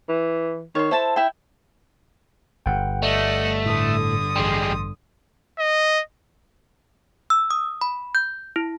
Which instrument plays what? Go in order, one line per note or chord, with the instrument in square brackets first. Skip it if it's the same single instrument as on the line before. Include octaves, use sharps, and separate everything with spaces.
[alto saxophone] E3
[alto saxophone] D#3 [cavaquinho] C#5 C6
[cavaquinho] E4 A4 A5 [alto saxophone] C5
[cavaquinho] E4 E5 G5
[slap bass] G1 [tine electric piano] F#5 G5
[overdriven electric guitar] A3 [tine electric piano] D5 [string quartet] D#5 F#5
[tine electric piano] A2 A4 [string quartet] D3 D#6
[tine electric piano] A1 C6 [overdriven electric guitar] G3 G#3
[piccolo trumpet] D#5
[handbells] E6
D#6
B5
G6
E4